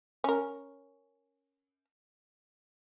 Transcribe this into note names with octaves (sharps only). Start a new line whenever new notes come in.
C#4 A#4